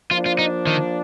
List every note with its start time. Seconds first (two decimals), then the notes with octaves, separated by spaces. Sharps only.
0.11 F3 A#3 D4 F4
0.26 F4
0.39 D#4
0.67 D#3